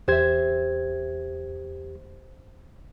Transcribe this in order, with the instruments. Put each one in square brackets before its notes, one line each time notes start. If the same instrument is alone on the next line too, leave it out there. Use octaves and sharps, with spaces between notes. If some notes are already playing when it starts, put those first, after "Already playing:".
[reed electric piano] E2 G4 G#6 [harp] C5 E5